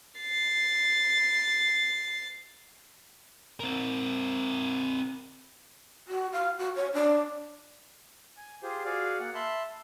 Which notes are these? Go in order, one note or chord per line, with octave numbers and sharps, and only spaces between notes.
A6 C7
C4 A#4
F#4
F5
F#4
C#5
D4
G#5
F4 G4 G#4 C5
F#4 G#4 D5 F5
A#3 F#5
E5 A5 B5 C6